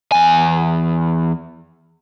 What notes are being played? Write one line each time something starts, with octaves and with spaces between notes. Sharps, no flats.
E2 G#5